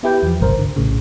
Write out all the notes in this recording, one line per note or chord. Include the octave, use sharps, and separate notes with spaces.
B3 E4 G4 B4 G5
E2 F3
G#1 C#2 G2 C3 A#4 C5
D3
A#1 A2 C#3